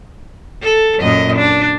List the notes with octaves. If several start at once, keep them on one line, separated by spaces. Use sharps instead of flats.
A4
F#2 A#2 D#5
D4